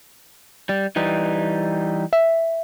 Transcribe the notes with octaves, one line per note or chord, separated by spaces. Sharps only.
G3
E3 G3 D#4
E5